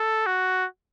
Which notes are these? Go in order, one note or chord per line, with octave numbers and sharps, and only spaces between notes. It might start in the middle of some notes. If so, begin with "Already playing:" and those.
Already playing: A4
F#4